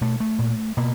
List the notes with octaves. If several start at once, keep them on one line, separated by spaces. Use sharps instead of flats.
B2 A3
A3
A#2
B2 A#3